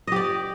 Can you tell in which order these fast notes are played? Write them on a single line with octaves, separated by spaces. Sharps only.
D#5 G4 D5